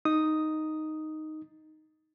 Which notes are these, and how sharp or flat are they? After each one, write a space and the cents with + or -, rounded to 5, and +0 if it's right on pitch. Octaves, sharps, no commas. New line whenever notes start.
D#4 +0 D#6 +0